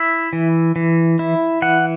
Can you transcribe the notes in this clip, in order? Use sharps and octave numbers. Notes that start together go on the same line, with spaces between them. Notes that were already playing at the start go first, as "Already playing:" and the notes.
Already playing: E4 E5
E3
E3
E4
E3 F#5